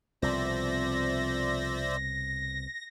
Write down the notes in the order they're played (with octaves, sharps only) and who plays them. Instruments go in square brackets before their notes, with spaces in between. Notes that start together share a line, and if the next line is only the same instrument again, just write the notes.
[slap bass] C2 B2 [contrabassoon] F2 [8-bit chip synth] C5 D5 E5 [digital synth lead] A#6